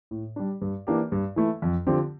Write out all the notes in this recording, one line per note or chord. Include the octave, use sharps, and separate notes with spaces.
A2
G3 D4
G2
E3 A#3 D4 G4
G2
E3 A3 E4
F2
D3 F3 C4 G4